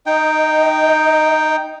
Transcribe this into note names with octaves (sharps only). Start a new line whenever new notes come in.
D#4 D#5 G5